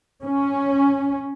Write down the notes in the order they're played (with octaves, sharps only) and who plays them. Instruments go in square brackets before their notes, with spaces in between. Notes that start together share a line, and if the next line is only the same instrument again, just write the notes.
[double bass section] C#4